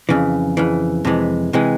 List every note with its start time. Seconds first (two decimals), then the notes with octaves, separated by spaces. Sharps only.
0.09 F2 C#3 E3
0.57 F2 C#3 E3
1.05 F2 C3 E3 G#3
1.53 C3 E3 G#3